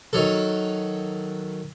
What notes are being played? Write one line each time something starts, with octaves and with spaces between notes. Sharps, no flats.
D#3 F#3 A4